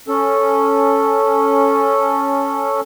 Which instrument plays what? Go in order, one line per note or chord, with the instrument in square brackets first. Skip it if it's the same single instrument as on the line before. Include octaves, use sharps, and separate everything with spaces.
[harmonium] C#4 A4